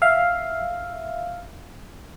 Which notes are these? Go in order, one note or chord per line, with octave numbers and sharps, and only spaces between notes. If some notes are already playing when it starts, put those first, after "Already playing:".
E5 F5